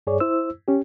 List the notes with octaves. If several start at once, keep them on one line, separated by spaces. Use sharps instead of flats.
G2 G#4 C#5 D5
E4 C5 E6
C#4 G4